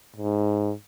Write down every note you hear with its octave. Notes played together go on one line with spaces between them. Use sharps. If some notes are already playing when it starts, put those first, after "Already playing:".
G#2